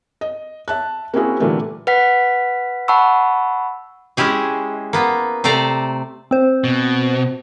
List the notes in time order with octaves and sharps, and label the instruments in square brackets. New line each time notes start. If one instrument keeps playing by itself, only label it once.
[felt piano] D#5
E5 A5 F#6
A#3 C4 C#4 E4 F#4 G#4
A#2 D3 E3 G3 A3 A#3
[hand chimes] B4 F#5 B6
F#5 A5 B5 C#6 E6
[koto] G#3 C#4 E4 G4 G#4
A#3 B3
C3 A3 C5 D5 A#5
[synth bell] C4 C5
[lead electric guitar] B2